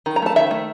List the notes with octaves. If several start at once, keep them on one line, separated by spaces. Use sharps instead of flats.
D#3
A#5
A3 A5
D#3 E5
A3